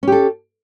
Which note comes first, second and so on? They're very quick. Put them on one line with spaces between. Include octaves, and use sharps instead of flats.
C#4 G4 A4